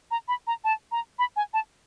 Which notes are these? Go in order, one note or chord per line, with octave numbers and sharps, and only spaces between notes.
A#5
B5
A#5
A5
A#5
B5
G#5
A5